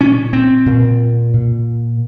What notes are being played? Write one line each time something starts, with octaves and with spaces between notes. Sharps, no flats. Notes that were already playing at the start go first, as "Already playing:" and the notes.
A#2 C#4
C4
A#2
A#2